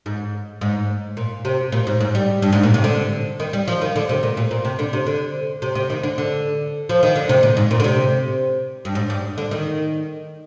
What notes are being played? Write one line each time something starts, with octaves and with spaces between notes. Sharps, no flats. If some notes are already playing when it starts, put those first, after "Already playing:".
G#2
G#2
A#2
C3
A#2
G#2
G#2
G3
G2
G#2
A#2
C3
D3
D#3
G3
F3
D#3
D3
C3
A#2
A#2
A#2
C3
D3
C3
D3
C3
C3
D#3
D3
D3
F3
D#3
D3
C3
A#2
G#2
A#2
D3
C3
G2
G#2
G2
D3
D#3